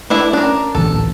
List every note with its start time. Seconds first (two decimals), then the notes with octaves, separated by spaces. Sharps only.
0.10 E3 A3 D4 E4
0.33 C#4 D4 A#4
0.75 D1 A#1 E3 A4